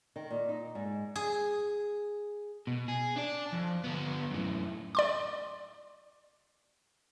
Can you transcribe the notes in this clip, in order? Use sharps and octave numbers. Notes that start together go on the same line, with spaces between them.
D#3
A#2
D#4
G#2
G#4
B2
G#4
D4 D5
F2
D3 B3
F#2 A2
D5 C6 D6